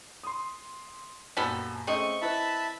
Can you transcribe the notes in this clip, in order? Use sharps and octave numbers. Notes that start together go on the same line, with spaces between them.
C6 D#6
F#2 A#2 G3 B3 A4
A3 C4 C#4 G#4 D#5 C#6
E4 B4 E5 A5 B5